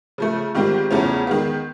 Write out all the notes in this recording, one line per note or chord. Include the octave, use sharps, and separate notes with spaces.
C#3 F3 A3
G#2 D#3 G3 C4 F4
E2 C#3 F3 A3 C#4
D#3 G#3 B3